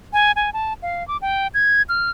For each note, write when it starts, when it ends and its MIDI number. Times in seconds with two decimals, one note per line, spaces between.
0.13 0.32 80
0.36 0.50 80
0.53 0.73 81
0.82 1.06 77
1.08 1.17 86
1.22 1.47 79
1.54 1.82 92
1.89 2.10 89